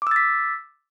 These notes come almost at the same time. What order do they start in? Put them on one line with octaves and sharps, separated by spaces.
D6 E6 A6 B6